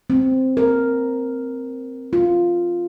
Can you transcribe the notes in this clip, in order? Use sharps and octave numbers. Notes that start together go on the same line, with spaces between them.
C4
A#4
F4